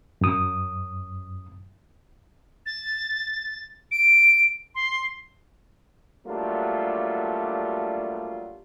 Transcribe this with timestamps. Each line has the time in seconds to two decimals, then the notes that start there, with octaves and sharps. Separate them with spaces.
0.21 F#2 D#6
2.66 A6
3.91 D7
4.75 C6
6.27 F#3 G3 A3 A#3 D4 F4